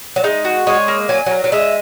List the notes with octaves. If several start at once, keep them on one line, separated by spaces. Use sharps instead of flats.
F#3
G#3 D#4
F#4
G#3 C#5
A#3
F#3 G#5
F#3 A#4
F#3
G#3 E5